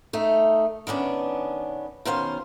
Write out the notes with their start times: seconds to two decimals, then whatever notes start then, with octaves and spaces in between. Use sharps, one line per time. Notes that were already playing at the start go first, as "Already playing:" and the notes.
0.13 A3 D#4
0.87 D#3 B3 C#4 D4
2.05 B2 D#3 C#4 C5 F5